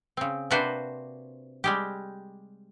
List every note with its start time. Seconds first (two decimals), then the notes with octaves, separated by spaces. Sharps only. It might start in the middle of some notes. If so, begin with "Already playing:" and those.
0.17 C#3 C4
0.51 C3 A#3 D4 F#4 B4 C5
1.64 G3 G#3 G4